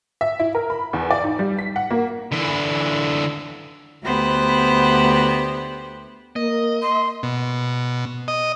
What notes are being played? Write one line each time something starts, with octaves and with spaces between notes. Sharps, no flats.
E5
E4
A#4
B5
E2
D5
D#4
G3
B6
F#5
A#3
D3 E3
D2 B3 G4 C5 B5 F#6
A#3 D#5
C6
B2
D#5